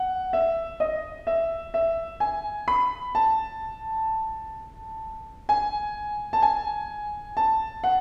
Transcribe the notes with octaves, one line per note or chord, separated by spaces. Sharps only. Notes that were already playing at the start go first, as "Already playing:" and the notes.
Already playing: F#5
E5
D#5
E5
E5
G#5
B5
A5
G#5
A5
G#5
A5
F#5